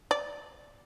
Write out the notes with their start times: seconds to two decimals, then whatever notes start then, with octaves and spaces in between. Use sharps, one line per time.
0.11 D5